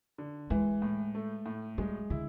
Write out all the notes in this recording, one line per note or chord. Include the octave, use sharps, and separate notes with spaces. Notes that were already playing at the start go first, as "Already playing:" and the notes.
D3
E3 G#3
A2
A3
A2
G3 G#3
D3 E4